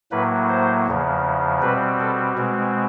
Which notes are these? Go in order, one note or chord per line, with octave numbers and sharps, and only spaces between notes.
A2 F#3 A#3 B4
C5
E2 C#3 F3
B2 G3 C4 B4
A4
B2 G#3 C4